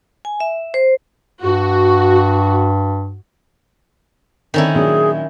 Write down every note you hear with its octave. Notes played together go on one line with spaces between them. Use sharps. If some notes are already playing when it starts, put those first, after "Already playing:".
G#5
E5
C5
G2 F#4
D3 D#3 C4 C#4 E4 A4 A#4
A#2 F#3 D4 G#4